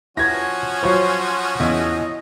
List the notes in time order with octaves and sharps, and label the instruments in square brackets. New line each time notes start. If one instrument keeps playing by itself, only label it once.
[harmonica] F3 C#4 F#4 [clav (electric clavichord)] E4 G4 B4 [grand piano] G#6 A#6
[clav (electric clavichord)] F#3 F4 D#5 [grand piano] C5 C#5 [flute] C6
[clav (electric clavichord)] E2 C#3 [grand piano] E4 [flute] D#5